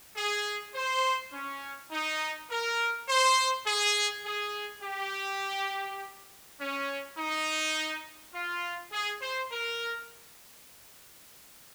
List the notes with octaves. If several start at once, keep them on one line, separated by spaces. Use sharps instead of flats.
G#4
C5
C#4
D#4
A#4
C5
G#4
G#4
G4
C#4
D#4
F4
G#4
C5
A#4